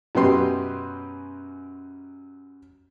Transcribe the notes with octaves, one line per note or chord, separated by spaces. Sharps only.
F#2 B2 C#4 G4 B4 C6